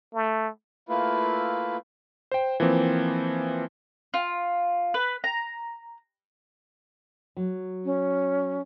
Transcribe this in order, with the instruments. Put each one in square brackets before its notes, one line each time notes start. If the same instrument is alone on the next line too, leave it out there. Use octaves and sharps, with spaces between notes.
[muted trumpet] A3
[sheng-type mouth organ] A3 A#3 E4 F4 B4
[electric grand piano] C5 G5
E3 F3 A#3 C4
[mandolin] F4
B4
A#5
[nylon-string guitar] F#3
[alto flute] C#4